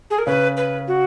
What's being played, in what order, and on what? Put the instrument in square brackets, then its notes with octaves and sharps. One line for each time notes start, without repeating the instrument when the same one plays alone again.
[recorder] G#4
A#4
[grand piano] C#3 C#4 [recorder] B4
[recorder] B4
F#4